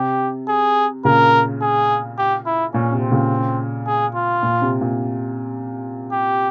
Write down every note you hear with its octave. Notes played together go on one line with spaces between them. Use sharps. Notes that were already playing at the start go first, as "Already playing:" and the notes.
Already playing: C3 G4
G#4
A#2 C#3 A#4
G#4
G4
E4
A#2 C#4
C3
C4
A#2 C#3
G#4
F4
A#2
C3
A#2
G4